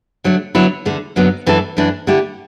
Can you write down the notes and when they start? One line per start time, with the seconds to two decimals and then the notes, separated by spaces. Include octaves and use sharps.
0.24 D3 F#3 A3
0.55 D3 F#3 B3 E4
0.85 E2 D3 A3
1.16 F#2 D3 F#3 B3
1.46 F#2 E3 A3 D4 A4
1.77 F#2 E3 A3 D4
2.07 D3 A3 E4 G4